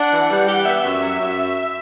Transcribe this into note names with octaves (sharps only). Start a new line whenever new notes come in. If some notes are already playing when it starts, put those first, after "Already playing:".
Already playing: D4 F#5
E3
G3
G4
B3 E5
F#2
F#3
F#2